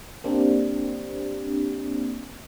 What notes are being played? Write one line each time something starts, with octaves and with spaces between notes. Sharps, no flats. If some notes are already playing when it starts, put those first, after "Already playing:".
A#3 C4 D4 G4